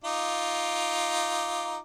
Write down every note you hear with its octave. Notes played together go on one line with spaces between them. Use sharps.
D#4 F4 D6